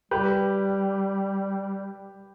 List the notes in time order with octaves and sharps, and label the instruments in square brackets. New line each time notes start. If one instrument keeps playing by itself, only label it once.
[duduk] G3 [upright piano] G4 B4